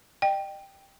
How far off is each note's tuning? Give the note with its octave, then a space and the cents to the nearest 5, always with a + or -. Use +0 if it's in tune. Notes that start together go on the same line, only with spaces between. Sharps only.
D#5 -40 G5 +0